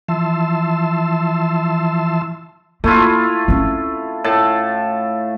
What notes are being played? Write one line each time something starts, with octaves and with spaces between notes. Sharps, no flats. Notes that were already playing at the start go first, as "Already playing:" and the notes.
E3 F3 E5 A5 C6 E6
A3 A#3 E4 F4
C4 C#4
A2 A5